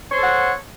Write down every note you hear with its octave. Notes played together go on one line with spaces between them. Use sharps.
A4 C5 C#5 F#5